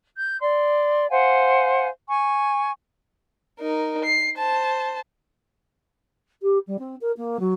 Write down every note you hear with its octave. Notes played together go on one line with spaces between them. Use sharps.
G6
D5 C6
C5 F5 F#5 G#5
G#5 C#6
D#4 A#4
C7
C5 A5
G4
G3
C4
A#4
A#3
F#3